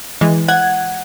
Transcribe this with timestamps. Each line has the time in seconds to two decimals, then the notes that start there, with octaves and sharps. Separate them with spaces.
0.21 E3 G#3
0.48 F#5 G#6